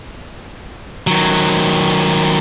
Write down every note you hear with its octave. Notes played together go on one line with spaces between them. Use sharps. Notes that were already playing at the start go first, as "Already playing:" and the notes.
D#3 F#3